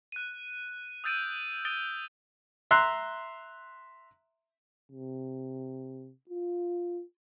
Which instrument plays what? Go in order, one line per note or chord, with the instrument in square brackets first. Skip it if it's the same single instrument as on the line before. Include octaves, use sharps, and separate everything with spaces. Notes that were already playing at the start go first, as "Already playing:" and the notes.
[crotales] F#6 D#7
D#6 E6 G6 A6 D7 D#7
D#6 A6 D7 D#7 G7
[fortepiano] E5 A#5 C6 F#6
[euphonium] C3
F4